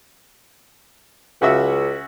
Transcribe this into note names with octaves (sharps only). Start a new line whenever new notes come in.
C#2 C#3 F#4 E5